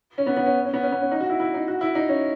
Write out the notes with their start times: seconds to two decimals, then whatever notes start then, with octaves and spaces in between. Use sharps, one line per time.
0.18 C#4
0.26 B3
0.37 B3
0.46 C#4
0.65 C#4
0.73 B3
0.83 C#4
0.92 B3
1.02 C#4
1.11 D#4
1.20 F#4
1.30 E4
1.40 E4
1.54 D#4
1.68 F#4
1.81 E4
1.95 D#4
2.09 C#4